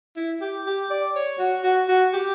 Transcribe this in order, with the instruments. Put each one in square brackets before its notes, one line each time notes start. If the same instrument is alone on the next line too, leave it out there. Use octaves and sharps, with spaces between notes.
[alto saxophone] E4
G4
G4
D5
C#5
F#4
F#4
F#4
G4